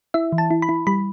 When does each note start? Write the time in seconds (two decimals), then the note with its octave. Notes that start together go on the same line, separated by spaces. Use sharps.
0.14 E4 E5
0.32 E3
0.38 A5
0.51 E4
0.62 B5
0.69 E4
0.87 G3 B5